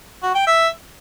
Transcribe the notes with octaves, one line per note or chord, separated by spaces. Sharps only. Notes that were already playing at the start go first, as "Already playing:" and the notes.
F#4
G5
E5